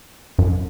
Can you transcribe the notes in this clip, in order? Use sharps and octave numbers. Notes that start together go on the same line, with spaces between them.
F#2